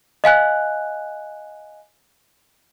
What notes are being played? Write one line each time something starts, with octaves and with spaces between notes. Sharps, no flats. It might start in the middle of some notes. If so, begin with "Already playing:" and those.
D#5 F5 G#5 F#6